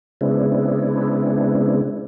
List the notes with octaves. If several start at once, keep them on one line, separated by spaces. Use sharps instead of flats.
C#3 G#3 B3 C4 D4 E4